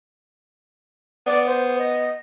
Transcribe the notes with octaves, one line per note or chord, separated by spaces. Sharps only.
B3 D5
C5
D#5